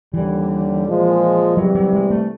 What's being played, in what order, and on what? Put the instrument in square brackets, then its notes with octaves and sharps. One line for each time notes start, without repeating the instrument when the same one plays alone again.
[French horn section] D#2 D3 G3 [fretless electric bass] E3
[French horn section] A#2 F3 G#3
[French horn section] C3 E3 G3 [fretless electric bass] F#3
[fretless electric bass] F#3
G#3
A3